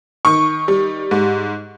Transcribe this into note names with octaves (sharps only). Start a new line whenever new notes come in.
D#3 C#6
G3
G#2